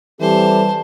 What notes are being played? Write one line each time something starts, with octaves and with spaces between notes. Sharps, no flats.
E3 G3 C4 G4 A4 C5 A5